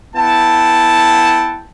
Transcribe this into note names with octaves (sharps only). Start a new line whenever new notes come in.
B3 E4 F#5 G5 A5